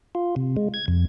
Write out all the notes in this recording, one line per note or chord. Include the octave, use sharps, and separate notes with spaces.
F4
C3
G#3
G#6
F2